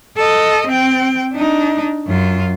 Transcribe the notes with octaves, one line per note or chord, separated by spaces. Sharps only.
A4 D#5
C4 G5
D4 D#4
F#2 F4